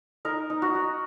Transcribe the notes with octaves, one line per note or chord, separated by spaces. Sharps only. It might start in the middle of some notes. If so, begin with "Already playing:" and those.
D#4 A#4
D#4
F#4
D#4